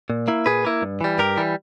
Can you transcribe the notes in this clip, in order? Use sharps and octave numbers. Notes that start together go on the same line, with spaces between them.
A#2
A#3 E4
A#2 G#4 B4
A#3 E4
G2
E3 G3
G2 G4 A#4
E3 G3